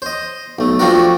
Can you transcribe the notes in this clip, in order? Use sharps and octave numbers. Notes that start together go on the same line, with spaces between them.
C5 D#5
B1 A3
F3 A3 C4 D4 F#4 A#4